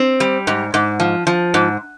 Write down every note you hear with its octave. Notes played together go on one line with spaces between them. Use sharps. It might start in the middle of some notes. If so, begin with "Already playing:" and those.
Already playing: C4
G3
G#2
G#2
F3
F3
G#2